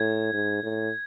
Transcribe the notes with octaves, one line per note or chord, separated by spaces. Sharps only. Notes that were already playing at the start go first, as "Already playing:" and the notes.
Already playing: A2 G#6
G#2
A2